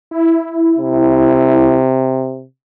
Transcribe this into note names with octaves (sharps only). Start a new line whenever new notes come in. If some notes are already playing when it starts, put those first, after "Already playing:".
E4
C3